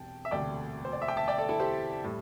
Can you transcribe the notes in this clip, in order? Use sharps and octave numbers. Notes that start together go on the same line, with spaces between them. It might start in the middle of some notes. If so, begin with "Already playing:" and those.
Already playing: E1 C3 G5 A5
E5
E1 D2 C3 A3 D5 G5
C5
D5
E5
G5
E5 A5
D5 G5
A4 D5
E4 A4
G4 C5
A2 G3